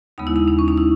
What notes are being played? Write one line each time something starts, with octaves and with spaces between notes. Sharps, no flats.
D#2 C#3 G#3 B3 D#4
E4
D#4
D#4
C#4
D#4
E4